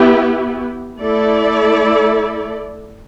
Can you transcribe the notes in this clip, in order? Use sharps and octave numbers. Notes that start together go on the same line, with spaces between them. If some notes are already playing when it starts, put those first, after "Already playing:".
Already playing: B3 E4 G4
A3 E4 A4 D5